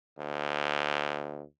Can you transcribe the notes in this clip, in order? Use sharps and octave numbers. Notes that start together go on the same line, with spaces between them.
D2